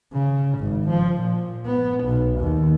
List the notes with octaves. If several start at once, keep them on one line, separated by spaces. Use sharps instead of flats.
C#3
G#1
F3
A#2
B3
B1
D#2